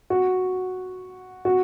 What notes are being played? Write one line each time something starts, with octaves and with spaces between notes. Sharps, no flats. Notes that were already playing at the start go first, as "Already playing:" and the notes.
F#4
F#4